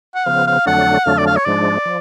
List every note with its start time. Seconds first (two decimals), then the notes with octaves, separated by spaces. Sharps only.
0.15 F#5
0.26 C#3 F3 B3 F5
0.47 F5
0.66 F2 D3 F#3 A3 D4 F#5
1.06 F2 D3 F#3 A3 D4 F5
1.18 D5
1.26 F5
1.36 C#5
1.45 G#2 F3 G#3 D4 D5
1.85 F3